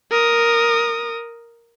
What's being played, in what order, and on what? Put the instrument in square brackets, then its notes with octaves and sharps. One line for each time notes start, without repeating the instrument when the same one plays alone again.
[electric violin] A#4 D#6